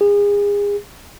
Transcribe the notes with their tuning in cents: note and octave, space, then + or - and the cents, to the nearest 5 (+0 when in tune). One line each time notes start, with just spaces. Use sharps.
G#4 -35